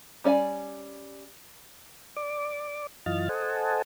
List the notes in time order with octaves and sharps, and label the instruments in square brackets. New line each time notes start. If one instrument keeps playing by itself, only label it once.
[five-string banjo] G3 C#4 D5 E5 G#5
[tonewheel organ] D5 D6
F#2 E3 F4 D#5 F6 A6
A4 C5 D#5 F#5 G#5 A5